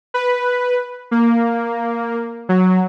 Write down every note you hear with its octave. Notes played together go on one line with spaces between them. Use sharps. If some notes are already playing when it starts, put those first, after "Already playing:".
B4
A#3
F#3